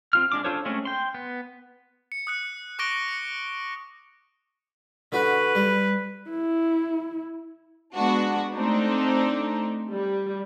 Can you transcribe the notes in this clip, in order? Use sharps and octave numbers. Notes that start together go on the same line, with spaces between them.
C4 F4 F6
G#3 D4 D6
D4 F4 A4 C5 C#5
G#3 A3 C4 C#4
G5 C6
B3
C#7
D#6 F#6 C#7
C#6 D6 F#6 A#6 D7 G7
C#7
D3 F#4 B4
G3
E4
G#3 B3 D4 F#4
A3 C4 D4 D#4
G3